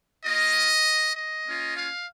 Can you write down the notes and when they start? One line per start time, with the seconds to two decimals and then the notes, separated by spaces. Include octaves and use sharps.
0.24 A#3 F4 D#5
1.15 D#5
1.45 A#3 C#4 F4
1.75 F5